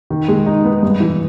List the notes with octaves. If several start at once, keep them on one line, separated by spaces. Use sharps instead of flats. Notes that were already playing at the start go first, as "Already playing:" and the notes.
D#3
G#3
D#4
B3
G2
E3